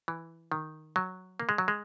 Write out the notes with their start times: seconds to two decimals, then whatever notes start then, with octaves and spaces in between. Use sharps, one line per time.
0.08 E3
0.52 D#3
0.96 F#3
1.40 A#3
1.49 G#3
1.58 F#3
1.68 G#3